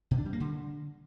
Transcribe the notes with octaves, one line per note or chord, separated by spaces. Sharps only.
B2
D4
G3
A#3
D3